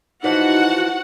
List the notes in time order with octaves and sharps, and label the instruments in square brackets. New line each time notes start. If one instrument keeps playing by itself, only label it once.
[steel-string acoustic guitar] E3 F3 [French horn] D#4 [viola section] F#4 F#5